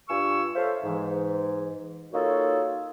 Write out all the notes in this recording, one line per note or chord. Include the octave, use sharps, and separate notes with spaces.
G2 F4 G#5 C#6 E6
A4 C5 C#5 E5 F5
G#2 E3
A#3 D#4 F4 F#4 A4 C#5